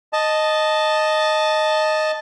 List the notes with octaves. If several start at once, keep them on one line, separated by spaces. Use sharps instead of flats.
D#5 A5